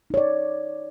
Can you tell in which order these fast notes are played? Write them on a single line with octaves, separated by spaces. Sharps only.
D#4 C#5 D5